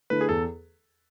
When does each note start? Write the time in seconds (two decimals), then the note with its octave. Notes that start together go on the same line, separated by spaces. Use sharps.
0.10 D3 A3 E4 B4
0.21 G#4
0.29 E2 A4